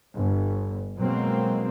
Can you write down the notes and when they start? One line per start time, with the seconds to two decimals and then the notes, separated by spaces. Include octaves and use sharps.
0.15 G1
0.98 B2 F#3 G#3 A#3 C4